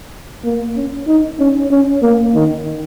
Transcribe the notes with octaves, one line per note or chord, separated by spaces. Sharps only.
A#3
C#4
D#4
C#4
C#4
A#3
D#3